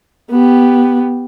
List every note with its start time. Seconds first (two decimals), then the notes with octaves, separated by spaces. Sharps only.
0.31 B3 G4